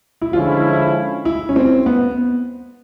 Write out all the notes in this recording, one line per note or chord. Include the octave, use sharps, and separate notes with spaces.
E4
D3 F3 G#3 C#4 E4 F4
E4
C#4
C4
B3